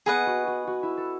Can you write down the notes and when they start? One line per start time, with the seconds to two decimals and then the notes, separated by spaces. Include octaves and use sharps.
0.06 B3 G#4 B4 D#5 F#5
0.27 F#4
0.47 F#4
0.67 F#4
0.83 E4
0.97 A4